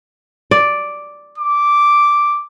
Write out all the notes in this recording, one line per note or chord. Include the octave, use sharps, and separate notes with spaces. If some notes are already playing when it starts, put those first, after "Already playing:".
D5
D6